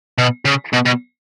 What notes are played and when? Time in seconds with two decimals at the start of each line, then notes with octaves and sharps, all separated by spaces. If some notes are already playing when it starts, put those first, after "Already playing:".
0.18 B2
0.45 C#3
0.73 B2
0.86 B2